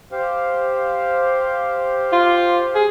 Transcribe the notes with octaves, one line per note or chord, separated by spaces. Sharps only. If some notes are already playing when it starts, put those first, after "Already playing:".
G4 C5 F5
F4
G#4